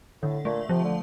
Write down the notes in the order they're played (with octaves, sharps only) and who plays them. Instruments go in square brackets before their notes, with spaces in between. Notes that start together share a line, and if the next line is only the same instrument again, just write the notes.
[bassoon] A2 [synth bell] D3
[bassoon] A#2 [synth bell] A3
[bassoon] C3 [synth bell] F3
[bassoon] D3